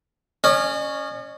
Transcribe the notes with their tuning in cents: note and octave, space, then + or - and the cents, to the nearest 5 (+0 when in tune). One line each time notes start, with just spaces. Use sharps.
C#4 +0 D#5 -45